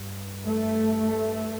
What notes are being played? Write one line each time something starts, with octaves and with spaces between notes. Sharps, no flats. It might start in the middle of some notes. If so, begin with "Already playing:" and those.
Already playing: G2
A3